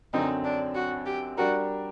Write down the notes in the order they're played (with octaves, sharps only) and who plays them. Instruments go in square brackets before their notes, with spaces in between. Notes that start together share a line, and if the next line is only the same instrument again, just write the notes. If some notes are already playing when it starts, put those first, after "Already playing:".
[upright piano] F#2 D3 F#3 C4 [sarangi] D#4
[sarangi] D4
F#4
G4
[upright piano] G3 D4 G4 A#4 [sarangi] F#4